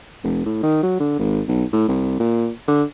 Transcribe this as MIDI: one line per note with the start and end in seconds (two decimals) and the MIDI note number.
0.24 0.45 29
0.45 0.60 45
0.63 0.79 51
0.83 0.97 54
1.00 1.14 50
1.19 1.42 32
1.48 1.64 35
1.73 1.87 45
1.88 2.18 36
2.20 2.50 46
2.68 2.83 50